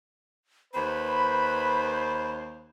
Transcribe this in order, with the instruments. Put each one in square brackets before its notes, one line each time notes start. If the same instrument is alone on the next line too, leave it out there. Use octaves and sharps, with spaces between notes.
[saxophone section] D#2 C5 [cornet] B4 [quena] B5